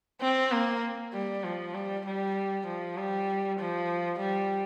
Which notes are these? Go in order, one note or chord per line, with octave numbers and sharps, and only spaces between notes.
C4
A#3
G3
F3
G3
G3
F3
G3
F3
G3